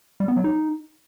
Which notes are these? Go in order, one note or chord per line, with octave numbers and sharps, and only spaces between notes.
G3
B3
F#3
D#4